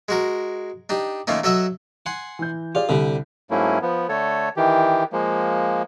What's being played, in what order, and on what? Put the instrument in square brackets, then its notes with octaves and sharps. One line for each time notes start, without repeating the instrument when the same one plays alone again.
[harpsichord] G#3 F#4 A#4
D4 D#4 G4
A#2 D#3 A3 A#3 C#4 D#4
F#3 A4 D#5 E5 F#5
F#5 G#5 C6
[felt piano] E3 G6
[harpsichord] F4 [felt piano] G4 G#4 D5
[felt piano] C2 [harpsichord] D3 G3
[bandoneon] G#2 F#3 A3 A#3 C#4 E4
F3 B3
D3 A3 A4 C#5
D#3 E3 G4
F3 G#3 A#3